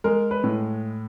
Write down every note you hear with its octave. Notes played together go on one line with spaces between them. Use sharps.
G#3 A#4
B4
A2